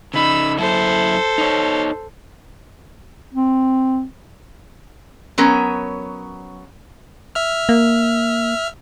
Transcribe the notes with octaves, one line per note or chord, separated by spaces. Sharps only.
C#3 D#4 B5 E6
F#2 E4 A4 C5
D#4 C#5
C4
F#3 B3 C#4 A#4
E5 F6
A#3